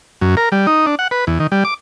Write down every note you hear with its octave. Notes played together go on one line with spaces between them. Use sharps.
F#2
A#4
G3
D#4
D4
F#5
B4
E2
D#3
G3
D6